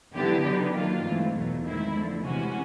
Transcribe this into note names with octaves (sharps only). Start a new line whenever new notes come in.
D3 F#3 B3 E4 G4
D3 F#3 B3 D#4
D#3 F#3 A#3 D4 F4
G#2 E3 A3 C4
E2 B2 F#3 A3
D#3 G#3 C4 E4
D3 F3 A3
C3 E3 G#3 C#4 F#4